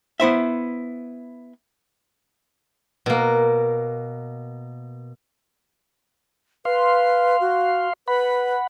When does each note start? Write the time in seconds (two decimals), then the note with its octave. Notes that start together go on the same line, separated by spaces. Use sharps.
0.20 B3 E4 C5 E5
3.06 B2 A#3
6.65 B4 F5 C6
7.40 F#4
8.08 B4 F#5 B5